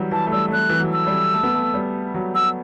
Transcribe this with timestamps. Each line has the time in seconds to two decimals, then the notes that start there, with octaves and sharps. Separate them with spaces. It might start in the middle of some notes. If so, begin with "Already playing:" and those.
Already playing: E3 F#3 G3
0.11 E3 A5
0.27 A3
0.31 G3 E6
0.48 A3
0.52 G3 F#6
0.70 E3
0.80 F#3
0.93 E6
1.07 G3
1.34 A3
1.43 B3
1.54 A3
1.74 G3
2.14 F#3
2.35 F#3 E6